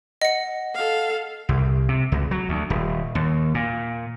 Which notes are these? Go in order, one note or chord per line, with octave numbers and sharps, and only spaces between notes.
D#5 F#5 C#7
A4 F5
C2
C3
C#2
F#3
D2
D#1
D#2
A#2